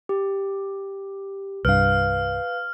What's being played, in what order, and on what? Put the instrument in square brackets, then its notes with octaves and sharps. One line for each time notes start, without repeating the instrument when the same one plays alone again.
[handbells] G4
[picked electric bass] C2 G2 [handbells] B4 F5 [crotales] F6